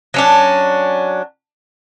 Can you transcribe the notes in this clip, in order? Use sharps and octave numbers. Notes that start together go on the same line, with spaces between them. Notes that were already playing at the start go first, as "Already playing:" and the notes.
F#3 C#4 D4